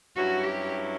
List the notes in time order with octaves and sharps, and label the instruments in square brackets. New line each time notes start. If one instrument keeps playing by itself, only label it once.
[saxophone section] G2 F#3 C#4 E4 [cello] F#4
[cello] G4